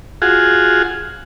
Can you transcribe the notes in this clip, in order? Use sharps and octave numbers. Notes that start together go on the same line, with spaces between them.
F4 F#4 G#4